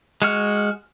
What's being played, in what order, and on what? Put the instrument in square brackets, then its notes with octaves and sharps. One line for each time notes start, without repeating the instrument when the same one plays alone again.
[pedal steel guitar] G#3 F#4 F6